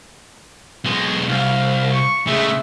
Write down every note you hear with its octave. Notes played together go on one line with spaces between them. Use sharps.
B1 G#3
C2 F5
C#6
C#3 G#3 A3 E5